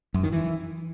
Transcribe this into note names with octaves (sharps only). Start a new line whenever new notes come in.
F#2
D#3
E3